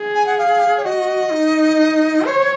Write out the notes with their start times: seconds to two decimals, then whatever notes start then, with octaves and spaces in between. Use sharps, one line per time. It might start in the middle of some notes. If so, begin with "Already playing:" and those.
Already playing: G#4
0.14 G#5
0.26 F#5
0.38 F5
0.77 C#5
0.85 F#4 D#5
1.31 D#4
2.25 C5 C#5